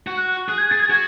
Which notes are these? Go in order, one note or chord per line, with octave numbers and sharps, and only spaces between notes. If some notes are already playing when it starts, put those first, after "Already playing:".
F#4
F#6
F#6
G#4 F#6
G#6
G#4 A6
G#6
F#4 G#6